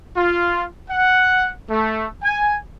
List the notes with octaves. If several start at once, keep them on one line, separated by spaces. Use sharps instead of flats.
F4
F#5
A3
G#5